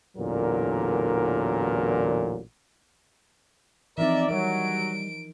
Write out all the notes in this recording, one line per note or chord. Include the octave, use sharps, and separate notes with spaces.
A1 E2 A#2 D3 F#3 A#4
E3 F3 C4 D#4 A#4 D5 E5
F#3 G3 A#4 D7